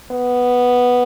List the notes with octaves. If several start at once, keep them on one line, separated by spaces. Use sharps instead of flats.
B3